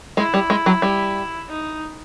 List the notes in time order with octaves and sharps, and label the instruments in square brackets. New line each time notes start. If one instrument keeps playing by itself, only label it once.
[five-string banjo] G#3 [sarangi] E4
[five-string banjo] G3
G#3
F#3
G3
[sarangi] D#4